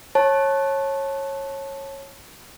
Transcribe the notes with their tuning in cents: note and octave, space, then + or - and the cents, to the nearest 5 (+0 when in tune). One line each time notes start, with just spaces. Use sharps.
C#5 -20 A5 -10